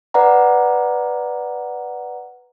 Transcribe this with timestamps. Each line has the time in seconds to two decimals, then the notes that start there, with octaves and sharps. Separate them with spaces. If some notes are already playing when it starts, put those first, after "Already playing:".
0.14 B4 D5 F#5 A#5